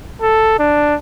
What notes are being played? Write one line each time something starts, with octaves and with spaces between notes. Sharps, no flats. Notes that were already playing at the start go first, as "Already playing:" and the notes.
A4
D4